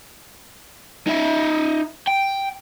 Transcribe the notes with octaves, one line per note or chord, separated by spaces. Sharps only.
D#4 E5
G5